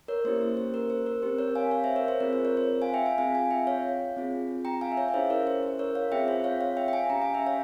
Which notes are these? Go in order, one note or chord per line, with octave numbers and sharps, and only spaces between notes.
A#4 C#5
A#3 C#4 E4 G4 C5
C5
C5
A#4
C5
A#4
C4 G4 C5
A#4 C#5
F5 G#5
C#5 F5
C5 E5
A#4 C#5
C5
C4 F4 G#4 A#4
C5
A#4 C#5
C5
F5 G#5
E5 G5
F5 G#5
C4 F4 G#4 F5 G#5
F5 G#5
E5 G5
C#5 F5
C4 F4 G#4
G5 A#5
F5 G#5
E5
C#5 F5
F5
C#4 E4 G#4 C5 E5
A#4 C#5
C5
C5
A#4 C#5
C#5 F5
C4 F4 G#4 E5 G5
C5 E5
C#5 F5
C#5 F5
E5 G5
G5
F5 G#5
C#4 G4 G5 A#5
F5 G#5
E5 G5
C#5 F5